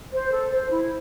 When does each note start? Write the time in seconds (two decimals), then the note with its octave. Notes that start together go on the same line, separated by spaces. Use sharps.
0.12 C5
0.32 A4
0.51 C5
0.70 E4